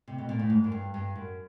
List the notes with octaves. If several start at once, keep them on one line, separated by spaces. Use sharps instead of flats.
C3
B2
A#2
A2
G#2
F#2
G2
G2
F#2